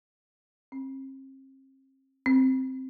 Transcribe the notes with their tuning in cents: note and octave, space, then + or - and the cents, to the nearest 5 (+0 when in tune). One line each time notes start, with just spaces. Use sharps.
C4 +40
C4 +0